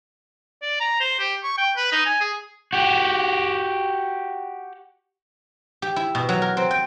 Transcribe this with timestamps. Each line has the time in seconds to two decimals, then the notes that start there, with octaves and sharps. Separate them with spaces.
0.62 D5
0.80 A#5
1.00 C5
1.19 G4
1.44 C#6
1.58 G5
1.77 B4
1.92 D#4
2.06 G#5
2.21 G#4
2.73 F#4 G4
5.82 G4
5.96 E4
6.15 B2
6.29 F#3
6.42 A#4
6.57 C4
6.71 G5